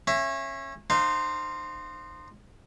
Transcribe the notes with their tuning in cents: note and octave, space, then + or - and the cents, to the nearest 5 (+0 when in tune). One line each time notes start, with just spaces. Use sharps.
C#4 -25 E5 +25
D#4 -35 C5 +0 F5 -15